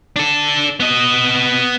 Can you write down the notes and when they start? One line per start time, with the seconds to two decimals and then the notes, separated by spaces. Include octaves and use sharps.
0.16 D4 A4
0.80 B3 D#5